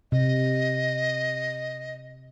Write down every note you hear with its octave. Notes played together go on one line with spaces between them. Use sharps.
C3 D#5